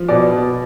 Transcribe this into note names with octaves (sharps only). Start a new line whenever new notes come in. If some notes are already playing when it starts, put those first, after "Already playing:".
Already playing: F3
B2 D5
B2